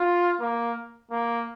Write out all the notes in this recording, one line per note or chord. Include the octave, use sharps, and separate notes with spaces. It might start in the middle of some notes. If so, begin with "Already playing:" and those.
Already playing: F4
A#3
A#3